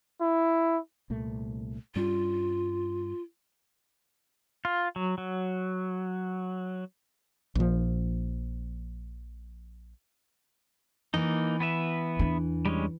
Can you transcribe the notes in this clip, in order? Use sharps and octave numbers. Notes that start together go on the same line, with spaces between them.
E4
C2 A#2 A3
G2 G3 C#4 F4
F4
F#3
F#3
A#1 F3
E3 A#3 D#4
B3 B4 E5
E2 D4
G3 G#3 C#4